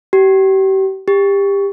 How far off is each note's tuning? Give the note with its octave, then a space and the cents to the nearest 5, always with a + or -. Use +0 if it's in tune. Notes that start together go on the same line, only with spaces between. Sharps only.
G4 -35
G4 +25